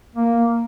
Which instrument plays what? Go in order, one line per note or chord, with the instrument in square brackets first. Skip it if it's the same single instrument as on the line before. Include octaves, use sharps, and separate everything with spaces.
[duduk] A#3